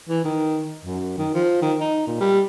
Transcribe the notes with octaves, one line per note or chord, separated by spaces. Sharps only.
E3
D#3
F#2
D#3
F3
D#3
D#4
A#2
G3